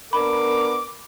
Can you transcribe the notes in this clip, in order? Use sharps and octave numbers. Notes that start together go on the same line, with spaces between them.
B3 D4 A#4 B5 D6